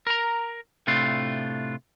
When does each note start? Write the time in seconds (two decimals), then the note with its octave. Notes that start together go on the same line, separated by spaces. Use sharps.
0.07 A#4 A#5
0.87 A2 C3 A3 D4 F4